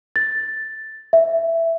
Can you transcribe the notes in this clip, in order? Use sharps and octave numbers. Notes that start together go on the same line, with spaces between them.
A6
E5